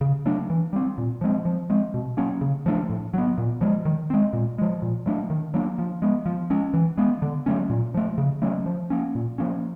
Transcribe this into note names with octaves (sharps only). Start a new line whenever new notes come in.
C#3
F#3 A3 D4
E3
G3 C4
A#2
F3 G#3 C4
F3
G#3 C4
B2
F#3 A#3 C#4
C#3
F3 A3 D4
A2
F#3 B3
A#2
F3 G#3
D#3
G#3 C4
A#2
F3 G#3
A#2
F#3 A3 D4
D#3
F#3 A#3 D4
F3
G#3 B3
F3
G#3 C#4
E3
G#3 B3
D3
F#3 A3 C#4
A#2
F3 A3
C#3
F#3 A3 C#4
F3
A#3 C#4
A#2
F3 A#3 C#4